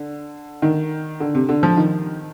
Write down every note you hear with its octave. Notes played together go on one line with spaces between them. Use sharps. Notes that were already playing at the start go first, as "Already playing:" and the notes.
Already playing: D3
D#3
D3
C3
D3
F3
D#3